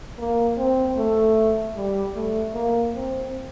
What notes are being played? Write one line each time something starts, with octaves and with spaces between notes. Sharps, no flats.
A#3
C4
A3
G3
A3
A#3
C4